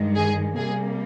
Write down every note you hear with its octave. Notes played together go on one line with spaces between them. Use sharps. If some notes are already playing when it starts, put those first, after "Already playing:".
Already playing: G2 D#3 G#3
G#4
C3 G3 A#3 G#4